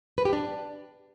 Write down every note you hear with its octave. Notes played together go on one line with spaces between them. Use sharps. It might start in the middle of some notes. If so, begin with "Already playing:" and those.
B4
G4
D4